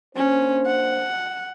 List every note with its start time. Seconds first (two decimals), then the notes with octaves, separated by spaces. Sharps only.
0.16 A#3 C#4 D4 C5
0.66 F#5